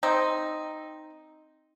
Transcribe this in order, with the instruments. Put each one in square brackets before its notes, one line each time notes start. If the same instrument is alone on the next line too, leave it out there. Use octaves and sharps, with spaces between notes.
[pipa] C4 D#4